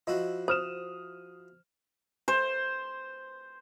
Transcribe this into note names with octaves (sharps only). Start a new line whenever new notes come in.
F3 E4 F#4 D#5
C5 D#6 F6 E7
C5